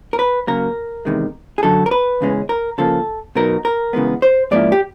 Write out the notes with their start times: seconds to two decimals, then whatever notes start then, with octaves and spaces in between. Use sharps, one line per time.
0.13 A#4
0.19 B4
0.47 C#3 F#3 A#3 A#4
1.05 E2 C3 D#3 G#3
1.58 G#4
1.63 F#2 D3 F#3 A4
1.86 A#4
1.91 B4
2.21 E2 C#3 E3 G#3 C#4
2.49 A#4
2.78 C#3 F3 A#3 A4
3.35 B2 F#3 B3 D#4 A#4
3.65 A#4
3.93 C#3 E3 G#3 B3
4.22 C5
4.51 G#2 F3 A#3 C#4 E4 D5
4.72 G4